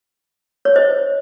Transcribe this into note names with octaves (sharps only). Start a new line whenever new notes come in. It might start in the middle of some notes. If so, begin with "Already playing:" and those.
C#5
C5 D#5